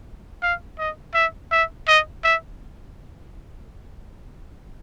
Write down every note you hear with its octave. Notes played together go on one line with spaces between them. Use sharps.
F5
D#5
E5
E5
D#5
E5